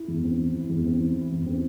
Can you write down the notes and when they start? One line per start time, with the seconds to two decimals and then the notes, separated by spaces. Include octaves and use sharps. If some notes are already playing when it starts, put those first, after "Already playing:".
Already playing: E4
0.08 E2
0.24 C4
0.40 E3
0.54 E4
0.69 E2
0.85 C4
1.00 E3
1.16 E4
1.32 E2
1.46 C4